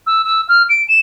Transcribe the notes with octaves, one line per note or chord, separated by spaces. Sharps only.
E6
E6
F6
D7
E7